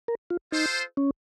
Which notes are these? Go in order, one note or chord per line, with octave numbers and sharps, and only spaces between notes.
A#4
F4
D#4 F4 A4 C5
C#4